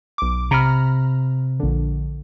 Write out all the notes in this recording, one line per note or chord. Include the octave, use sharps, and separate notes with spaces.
B1 D6
C3 A#5 B5 F6
A#1 D3